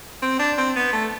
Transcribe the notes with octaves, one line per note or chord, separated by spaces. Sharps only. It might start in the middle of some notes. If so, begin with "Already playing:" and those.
C4
D4
C4
B3
A3